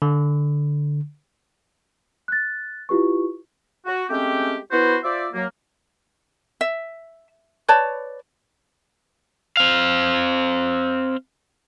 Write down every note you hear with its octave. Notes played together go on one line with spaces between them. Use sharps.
D3
F#6 A6
E4 F4 G4 B4 C#6
F#4
G#3 A3 C4 C#4 G4
B3 E4 F#4 C5
F4 C5 D5 E5
F#3 A#3
E5
B4 C#5 D5 A5
C4 F5